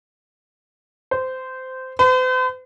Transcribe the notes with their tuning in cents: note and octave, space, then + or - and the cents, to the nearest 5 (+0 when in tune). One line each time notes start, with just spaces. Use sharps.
C5 -15
C5 -45